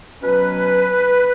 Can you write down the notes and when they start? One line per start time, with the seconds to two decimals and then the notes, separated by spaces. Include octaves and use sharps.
0.22 B2 F#3 C#4 B4